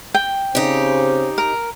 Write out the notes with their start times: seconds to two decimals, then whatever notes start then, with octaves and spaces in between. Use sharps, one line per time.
0.14 G5
0.55 C#3 C4 D#4 G4 C5
1.38 A#4